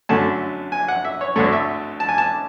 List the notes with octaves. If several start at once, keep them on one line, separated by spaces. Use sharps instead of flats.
F#2 D3 A3 A5
G#5
F#5
E5
C#5
D2 D3 A3 C#5
E5
A5
G#5
A5